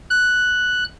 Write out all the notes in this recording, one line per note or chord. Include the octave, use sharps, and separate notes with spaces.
F#6